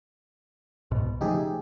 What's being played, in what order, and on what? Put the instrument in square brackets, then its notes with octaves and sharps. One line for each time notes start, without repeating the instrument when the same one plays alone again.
[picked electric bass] C2 G#2 B2
[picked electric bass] C#3 F3 A3 [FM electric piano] D#4 G4 G#4